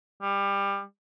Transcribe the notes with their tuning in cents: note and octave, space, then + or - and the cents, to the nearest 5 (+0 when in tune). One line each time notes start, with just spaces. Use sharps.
G3 +25